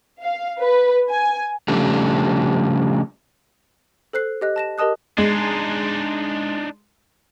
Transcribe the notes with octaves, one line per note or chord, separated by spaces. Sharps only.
F5
B4
G#5
C#3 F3 G3 A3 D4
A4 C5 F#6 C7
G4 D#5 F#6
A5 A#6 E7
G4 A#4 D#5 A5 D#6 F#6
G#3 D4 D#4